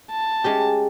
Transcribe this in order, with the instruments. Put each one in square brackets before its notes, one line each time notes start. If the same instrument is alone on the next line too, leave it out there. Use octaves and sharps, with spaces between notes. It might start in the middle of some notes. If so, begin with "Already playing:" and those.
[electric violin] A5
[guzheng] G#3 C#4 G4